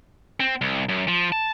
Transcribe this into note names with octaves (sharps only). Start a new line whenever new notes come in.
C4
C2
F#2
F3
A5